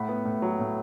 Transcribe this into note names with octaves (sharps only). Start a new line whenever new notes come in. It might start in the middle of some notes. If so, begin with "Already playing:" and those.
Already playing: A2 F#5 B5
B3
A2
F#3
A2